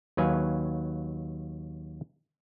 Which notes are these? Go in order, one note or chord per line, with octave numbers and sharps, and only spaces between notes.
D#2 F#3 B4 F5 G#5